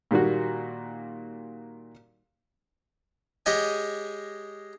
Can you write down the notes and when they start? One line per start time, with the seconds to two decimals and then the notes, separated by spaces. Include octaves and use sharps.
0.11 A#2 D#3 G3 A#3 F#4
3.46 G#3 G4 C#5 D#5 G#5